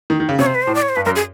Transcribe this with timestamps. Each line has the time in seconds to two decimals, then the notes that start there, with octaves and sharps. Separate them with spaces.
0.10 D#3
0.20 D#3
0.29 C#3
0.39 C3 C#5
0.46 C5
0.55 B4
0.62 A2 C5
0.75 D5
0.82 C#5
0.89 C5
0.96 G2 B4
1.05 F#2 A#4
1.16 G#4